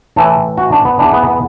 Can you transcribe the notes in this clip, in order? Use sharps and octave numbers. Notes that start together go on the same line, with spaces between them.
A2 E3 A4
F#4
D4
B3
E2 E3 D4
B3
B3